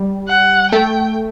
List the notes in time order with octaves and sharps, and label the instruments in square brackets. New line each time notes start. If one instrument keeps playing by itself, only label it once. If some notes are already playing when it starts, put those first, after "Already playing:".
Already playing: [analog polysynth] G3
[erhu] F#5
[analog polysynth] A3 [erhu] G5